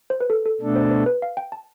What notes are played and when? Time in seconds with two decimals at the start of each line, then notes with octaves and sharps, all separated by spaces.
0.10 C5
0.21 B4
0.30 A4
0.46 A4
0.61 B2 A3 D4 A4
0.76 C5
0.91 C5
1.06 B4
1.22 F5
1.37 G5
1.52 A5